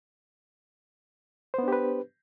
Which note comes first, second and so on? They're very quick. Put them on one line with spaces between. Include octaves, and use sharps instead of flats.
C5 B3 D4 G4 B4